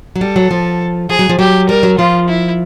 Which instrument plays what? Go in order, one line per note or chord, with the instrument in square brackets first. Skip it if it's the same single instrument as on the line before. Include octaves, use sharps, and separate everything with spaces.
[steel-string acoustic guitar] F#3
[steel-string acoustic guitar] G3 [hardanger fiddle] A4
[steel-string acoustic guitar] F#3
F3
[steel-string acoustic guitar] F3 [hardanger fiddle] G#4
[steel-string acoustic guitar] F#3
F3
[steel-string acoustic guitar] F#3 [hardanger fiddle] G4
[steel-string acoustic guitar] G3 [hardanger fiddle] A#4
[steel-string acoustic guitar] F#3
[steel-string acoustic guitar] F3 [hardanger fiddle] F4
[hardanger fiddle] E4